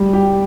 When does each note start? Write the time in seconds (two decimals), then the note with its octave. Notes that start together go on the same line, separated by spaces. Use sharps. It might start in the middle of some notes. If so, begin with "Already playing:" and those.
Already playing: G3
0.13 G4